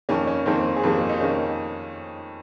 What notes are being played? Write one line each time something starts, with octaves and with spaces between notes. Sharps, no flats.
F2 D#3 A#3 C#4
C#4
F2 D#3 A#3 C4
G#4
F2 D#3 A#3 G4
F4
D#4
D#3 A#3 C#4